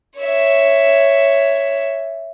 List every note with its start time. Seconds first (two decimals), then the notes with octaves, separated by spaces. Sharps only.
0.17 C#5 E5